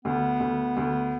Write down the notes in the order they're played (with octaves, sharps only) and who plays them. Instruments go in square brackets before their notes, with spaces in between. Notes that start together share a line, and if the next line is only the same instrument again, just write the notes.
[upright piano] D2 [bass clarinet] B3
[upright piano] D2
D2